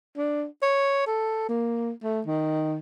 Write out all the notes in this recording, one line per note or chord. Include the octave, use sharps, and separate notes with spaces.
D4
C#5
A4
A#3
A3
D#3